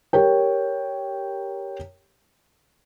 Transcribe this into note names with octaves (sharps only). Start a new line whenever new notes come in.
G4 A#4 C#5 G5